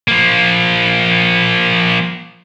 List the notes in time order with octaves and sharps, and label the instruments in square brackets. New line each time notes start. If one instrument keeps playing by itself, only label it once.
[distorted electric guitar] F3 A#3